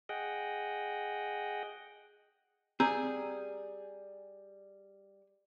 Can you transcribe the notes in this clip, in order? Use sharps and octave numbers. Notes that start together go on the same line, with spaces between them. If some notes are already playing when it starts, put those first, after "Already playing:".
G#4 D#5 F#5 G5
G3 C4 G#4 A#5 E6 G6